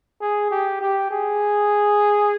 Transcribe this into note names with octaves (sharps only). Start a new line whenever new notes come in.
G#4
G4
G4
G#4